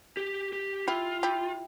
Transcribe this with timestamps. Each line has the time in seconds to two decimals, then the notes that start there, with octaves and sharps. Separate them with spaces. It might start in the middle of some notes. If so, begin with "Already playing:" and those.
0.17 G4
0.53 G4
0.88 E4 F4 G4
1.23 E4 G4